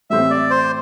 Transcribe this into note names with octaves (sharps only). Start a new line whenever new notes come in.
A2 E3 A3 C4 G4 E5
D5
C5